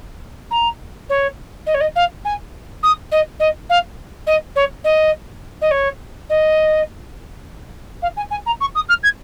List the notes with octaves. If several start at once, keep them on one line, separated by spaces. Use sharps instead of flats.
A#5
C#5
D#5
C#5
D#5
F5
G#5
D#6
D#5
D#5
F5
D#5
C#5
D#5
D#5
C#5
D#5
F5
G#5
G#5
A#5
C#6
D#6
F6
G#6